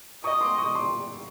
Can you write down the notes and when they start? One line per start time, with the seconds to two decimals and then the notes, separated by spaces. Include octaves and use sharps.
0.24 D#5 C#6 D#6
0.41 C6 D6
0.58 C#6 D#6
0.75 C6 D6